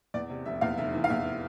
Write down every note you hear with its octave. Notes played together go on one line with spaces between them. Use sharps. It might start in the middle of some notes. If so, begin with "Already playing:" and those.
E2 D5
C3
F1 E5
E2 F5
F1 E5
E3
F5
E2 E5